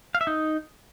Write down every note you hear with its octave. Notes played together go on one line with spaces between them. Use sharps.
F5
E5
D#4